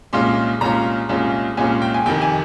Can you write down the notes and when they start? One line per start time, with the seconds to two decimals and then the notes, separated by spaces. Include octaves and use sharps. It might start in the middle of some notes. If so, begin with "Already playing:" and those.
0.13 C2 A#2 G#3 C#4 F4 C6
0.61 C2 A#2 G#3 C#4 F4 A#5
1.09 C2 A#2 G#3 C#4 F4
1.57 C2 A#2 G#3 C#4 F4 G#5
1.82 G5
1.94 G#5
2.06 F2 C3 D#3 G5
2.22 G#5